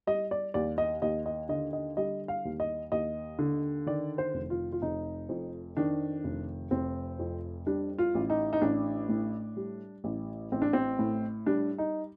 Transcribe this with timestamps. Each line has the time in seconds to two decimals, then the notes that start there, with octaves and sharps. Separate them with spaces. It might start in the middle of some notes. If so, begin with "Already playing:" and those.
0.07 G3 D#5
0.31 D5
0.54 D#2 D5
0.78 D#5
1.02 D#2 D#5
1.26 D#5
1.49 D3 D#5
1.73 D#5
1.97 G3 D#5
2.28 F5
2.45 D#2
2.60 D#5
2.92 D#2 D#5
3.39 D3
3.86 D#3 D5
4.18 C5
4.34 F1
4.50 F4
4.72 F4
4.82 F1 D#4
5.29 F2
5.77 D#3 D4
6.24 F1
6.71 F1 C4
7.19 F2
7.67 G3 D4
7.98 F4
8.15 A1
8.30 D#4
8.53 D#4
8.61 A1 D4
9.09 A2
9.57 G3
10.04 A1
10.52 A1 C4
10.62 D4
10.73 C4
10.99 A2
11.46 G3 D4
11.78 D#4